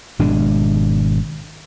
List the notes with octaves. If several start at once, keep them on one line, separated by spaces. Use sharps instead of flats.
G#1 B2 G#3 D4